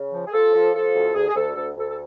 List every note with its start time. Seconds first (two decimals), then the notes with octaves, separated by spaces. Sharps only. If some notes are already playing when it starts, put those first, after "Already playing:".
Already playing: C#3
0.12 F3
0.26 G#4
0.33 F3 A4
0.53 F3
0.75 F3 A4
0.95 D2
1.14 D2 G#4
1.28 G#4
1.35 D2 A4
1.55 D2 A4
1.75 D2 A4
1.89 A4